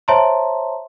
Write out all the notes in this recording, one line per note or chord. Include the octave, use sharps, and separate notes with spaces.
C5 C#5 E5 A5 A#5 C6